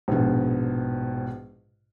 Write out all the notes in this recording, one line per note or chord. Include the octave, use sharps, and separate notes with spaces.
A#1 G#2 B2